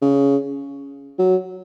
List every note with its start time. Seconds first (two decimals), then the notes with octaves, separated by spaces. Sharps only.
0.02 C#3
1.18 F#3